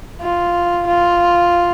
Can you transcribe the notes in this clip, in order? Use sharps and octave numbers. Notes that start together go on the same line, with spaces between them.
F4
F4